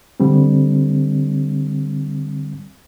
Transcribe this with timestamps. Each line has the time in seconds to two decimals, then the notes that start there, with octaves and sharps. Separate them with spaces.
0.20 D3 G3 C4